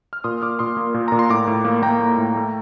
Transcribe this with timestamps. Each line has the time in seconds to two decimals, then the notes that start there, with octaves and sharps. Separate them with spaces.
0.13 F6
0.24 A#2 C6 D#6
0.42 A#2 D6 F6
0.59 A#2 C6 D#6
0.77 A#3
0.94 A#2
1.08 A#2 A#5
1.19 C6
1.30 A2 A#5 D6
1.48 A2
1.65 A#3
1.82 A#3 G5 A#5
2.00 A#3
2.18 A2
2.36 A3